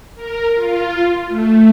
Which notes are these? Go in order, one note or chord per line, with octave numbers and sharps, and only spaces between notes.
A#4
F4
A3